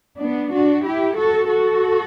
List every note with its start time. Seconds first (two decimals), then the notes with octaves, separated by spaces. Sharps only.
0.21 B3 D4
0.53 D4 F#4
0.86 E4 G4
1.18 F#4 A4
1.50 F#4 A4